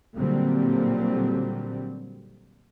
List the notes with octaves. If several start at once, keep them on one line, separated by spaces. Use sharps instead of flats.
A#2 D3 F#3 G3 C4